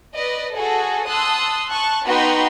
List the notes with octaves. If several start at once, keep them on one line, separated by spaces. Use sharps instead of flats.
B4 D5 D#5
F#4 G#4 A4
A5 C6 D#6 E6 F#6
A5 C#6 F#6
B3 D#4 F#4 G5 B5 C6